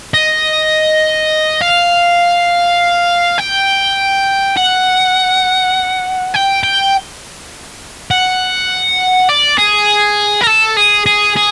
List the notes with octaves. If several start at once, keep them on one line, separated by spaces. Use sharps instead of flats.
D#5
F5
G5
F#5
G5
G5
F#5
D5
G#4
A#4
A4
G#4
G#4
G#4